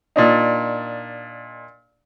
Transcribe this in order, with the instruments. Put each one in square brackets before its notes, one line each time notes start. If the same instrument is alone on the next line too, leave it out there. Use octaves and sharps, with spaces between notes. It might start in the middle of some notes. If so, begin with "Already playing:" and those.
[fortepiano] A#2 D4 D#4